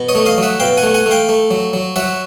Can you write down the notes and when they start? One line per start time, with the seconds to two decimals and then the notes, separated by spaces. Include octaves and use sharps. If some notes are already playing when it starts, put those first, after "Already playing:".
Already playing: B2
0.09 C#5 D#5
0.15 A3
0.26 D#5 F5
0.38 F#3
0.43 E5 F#5
0.60 B2 F5 G5
0.77 F#5 G#5
0.83 A3
0.94 F#5 G#5
1.06 A3
1.11 F5 G5
1.29 A3
1.51 F#3
1.73 F#3
1.96 F#3 E5 F#5